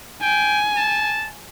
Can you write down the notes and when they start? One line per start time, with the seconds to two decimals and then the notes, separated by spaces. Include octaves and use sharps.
0.22 G5 G#5
0.77 A5